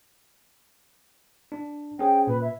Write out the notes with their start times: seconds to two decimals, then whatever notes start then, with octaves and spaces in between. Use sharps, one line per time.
1.52 D4
1.99 C#4 G#4 C5 G5
2.27 A#2 B4
2.42 E5